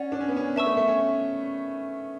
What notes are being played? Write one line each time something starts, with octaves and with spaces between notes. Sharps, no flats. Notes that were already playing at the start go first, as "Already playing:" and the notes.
Already playing: C#4 D5 F#5
D4
C#4
B3
C#4
B3 E5 A5 C#6 E6
A3
A3
C#4